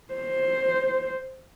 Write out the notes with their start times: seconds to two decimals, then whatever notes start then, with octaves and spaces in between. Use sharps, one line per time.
0.14 C5